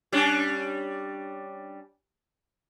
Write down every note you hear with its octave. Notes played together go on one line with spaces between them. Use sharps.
G3 C#4 D4